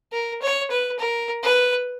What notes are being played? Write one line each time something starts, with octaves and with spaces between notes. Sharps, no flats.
A#4
C#5
B4
A#4
B4